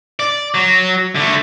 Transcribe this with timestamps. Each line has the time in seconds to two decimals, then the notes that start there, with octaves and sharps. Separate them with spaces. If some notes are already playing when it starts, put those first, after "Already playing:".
0.19 D5
0.54 F#3
1.16 D3 A3